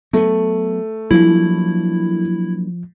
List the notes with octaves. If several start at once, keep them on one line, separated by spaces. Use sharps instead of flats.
F#3 A3 B3
F3 F#3 A#3 D4 E4